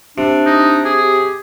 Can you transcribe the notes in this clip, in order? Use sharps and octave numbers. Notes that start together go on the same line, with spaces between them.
C3 D4
D#4
G4 G#4
G4